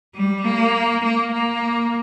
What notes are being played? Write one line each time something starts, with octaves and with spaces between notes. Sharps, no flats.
G3
A#3
A#3
A#3